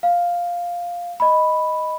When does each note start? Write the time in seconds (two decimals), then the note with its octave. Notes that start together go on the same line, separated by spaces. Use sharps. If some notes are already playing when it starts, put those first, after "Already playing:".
0.03 F5
1.20 D#5 B5